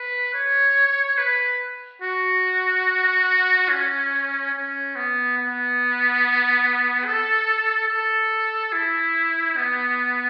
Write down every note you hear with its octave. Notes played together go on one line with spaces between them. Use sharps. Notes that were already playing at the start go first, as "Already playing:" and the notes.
Already playing: B4
C#5
B4
F#4
C#4
C#4
B3
B3
A4
A4
E4
B3